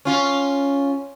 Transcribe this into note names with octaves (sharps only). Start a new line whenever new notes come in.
C#4 F4